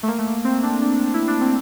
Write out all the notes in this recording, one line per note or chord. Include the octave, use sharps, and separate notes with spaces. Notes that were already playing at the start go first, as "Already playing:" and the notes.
A3
A#3
A3
A#3
C4
D4
D4
E4
D4
C4